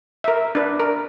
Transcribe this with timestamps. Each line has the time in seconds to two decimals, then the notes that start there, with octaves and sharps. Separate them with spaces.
0.24 A#4 E5
0.55 D4 B4
0.80 A#4